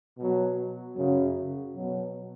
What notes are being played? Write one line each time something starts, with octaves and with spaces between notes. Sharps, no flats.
B2 F#3
F#2 C#3 F#3
B2 F#3